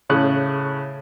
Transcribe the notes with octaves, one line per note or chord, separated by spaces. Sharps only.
A2 C#3 F#6